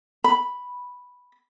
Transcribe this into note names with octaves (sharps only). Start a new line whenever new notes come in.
B5